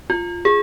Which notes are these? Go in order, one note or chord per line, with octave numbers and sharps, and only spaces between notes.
F4
G#4